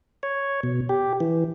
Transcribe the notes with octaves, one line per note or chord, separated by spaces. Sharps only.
C#5
B2
G4
E3